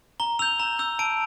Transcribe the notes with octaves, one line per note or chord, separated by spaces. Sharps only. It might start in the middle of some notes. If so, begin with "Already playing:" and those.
A#5 G7
E6 G6 F7
A#5
E6 G6
A5 D7